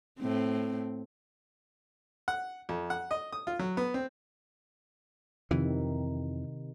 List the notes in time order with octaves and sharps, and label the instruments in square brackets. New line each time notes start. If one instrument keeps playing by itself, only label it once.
[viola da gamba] A2 C4
[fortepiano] F#5
F2
F#5
D#5
D#6
F4
F#3
B3
C4
[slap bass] F2 E3 [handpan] C3 D#3